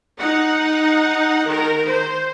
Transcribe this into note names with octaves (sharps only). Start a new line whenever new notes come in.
D#4 F#5
D#3 A#4
C5